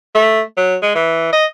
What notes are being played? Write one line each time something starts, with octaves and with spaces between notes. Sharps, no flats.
A3
F#3
G#3
E3
D#5